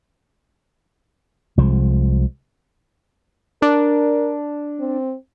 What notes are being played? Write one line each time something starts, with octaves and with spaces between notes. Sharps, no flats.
C2 F3 G#3
D4 A#4
C4